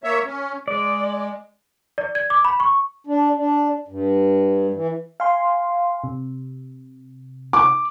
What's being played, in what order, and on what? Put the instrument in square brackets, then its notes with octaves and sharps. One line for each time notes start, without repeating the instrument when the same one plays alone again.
[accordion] A#3 C#5 E5
C#4
[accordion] G#3 [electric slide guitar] D5
[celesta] D5
G#6
D6
B5
C#6
[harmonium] D4
D4
G2
E3
[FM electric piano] F5 G#5 C6
C3
[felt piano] D6